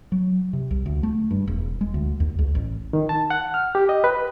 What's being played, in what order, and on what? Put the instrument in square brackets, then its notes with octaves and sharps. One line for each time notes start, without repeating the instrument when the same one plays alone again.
[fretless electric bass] F#3
C3
C2
D2
A3
G2
E1
G#3
D2
D#2
C#2
A1
[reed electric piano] D#3
A5
F#5
F6
G4
D#5
B4